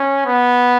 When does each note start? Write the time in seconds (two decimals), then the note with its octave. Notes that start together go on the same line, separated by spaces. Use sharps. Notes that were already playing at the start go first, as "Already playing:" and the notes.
Already playing: C#4
0.26 B3